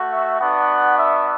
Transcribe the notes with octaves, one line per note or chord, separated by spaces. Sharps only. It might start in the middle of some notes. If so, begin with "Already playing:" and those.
Already playing: A3 F#4
E5
B3 D4 F#4 F#5
E5